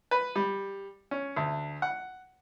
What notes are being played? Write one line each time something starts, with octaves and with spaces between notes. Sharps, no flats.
B4
G3
C#4
D2
F#5